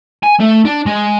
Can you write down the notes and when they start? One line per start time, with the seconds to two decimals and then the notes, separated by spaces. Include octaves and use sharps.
0.24 G#5
0.40 A3
0.65 D4
0.86 G#3